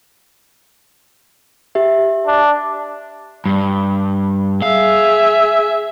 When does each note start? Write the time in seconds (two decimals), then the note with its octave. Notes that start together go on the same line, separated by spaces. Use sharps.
1.75 G4 E5
2.26 D4
3.46 G2
4.62 G#4 E5 F5